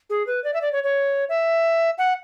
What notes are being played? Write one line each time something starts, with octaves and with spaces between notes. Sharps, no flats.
G#4
B4
D5
E5
D5
C#5
C#5
E5
F#5